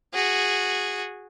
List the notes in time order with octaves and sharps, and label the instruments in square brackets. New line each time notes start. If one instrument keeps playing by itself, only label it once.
[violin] F#4 G#4